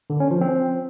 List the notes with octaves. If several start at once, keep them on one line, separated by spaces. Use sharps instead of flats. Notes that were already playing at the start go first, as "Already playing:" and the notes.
D3
C#4
F3
C4